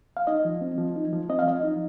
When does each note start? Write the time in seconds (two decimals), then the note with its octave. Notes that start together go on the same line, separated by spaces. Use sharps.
0.17 F5
0.27 D#4 D#5
0.45 F3
0.61 C4
0.78 F3
0.96 D#4
1.13 F3
1.29 C4 D#5
1.39 F5
1.47 F3 D#5
1.63 D#4